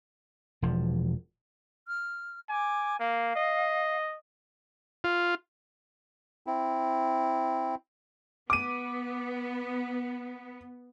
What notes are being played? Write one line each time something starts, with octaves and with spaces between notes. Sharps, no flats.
E1 F3
F6
G#5 D6
A#3 F5
D#5
F4
C4 E4
B3 D6 D#7